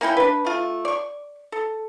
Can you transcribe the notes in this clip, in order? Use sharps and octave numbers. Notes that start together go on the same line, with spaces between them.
A#3 C#4 E4 G5
D4 B4
A3 F4
D5 C#6
A4